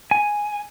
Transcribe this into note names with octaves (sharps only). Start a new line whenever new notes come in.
G#5